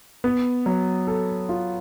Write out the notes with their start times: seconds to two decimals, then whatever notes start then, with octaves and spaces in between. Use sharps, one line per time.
0.24 B3
0.66 F#3
1.07 A4
1.49 F4